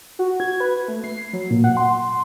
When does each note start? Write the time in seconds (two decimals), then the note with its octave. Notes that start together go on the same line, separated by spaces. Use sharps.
0.19 F#4
0.40 G#6
0.60 B4
0.88 A3
1.04 C7
1.33 F#3
1.50 A#2
1.64 F#5
1.77 C6